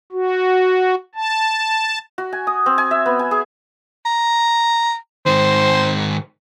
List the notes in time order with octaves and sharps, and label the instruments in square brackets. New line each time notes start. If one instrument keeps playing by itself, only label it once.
[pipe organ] F#4
A5
[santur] F#4
G#5
D#6
C4
G#5
E5
B3
G#5
G#4
[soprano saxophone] A#5
[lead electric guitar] G#2 D#3 [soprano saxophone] C5